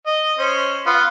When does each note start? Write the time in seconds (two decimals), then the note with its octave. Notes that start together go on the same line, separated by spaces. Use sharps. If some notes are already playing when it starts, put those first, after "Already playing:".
0.06 D#5
0.38 C#4 C5
0.86 B3 F4